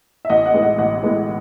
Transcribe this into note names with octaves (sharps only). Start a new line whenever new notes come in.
E5
A1 D#5 F#5
D#5 F#5
A2 G#3 B3
D#5 F#5
A1 D#5 F#5
A2 G#3 B3